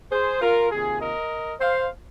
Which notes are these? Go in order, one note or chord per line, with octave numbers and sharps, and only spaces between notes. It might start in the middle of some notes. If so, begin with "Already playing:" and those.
G#4 C5
F4 A#4
C3 D#3 A#3 F4 G#4
A#4 D#5
C5 F5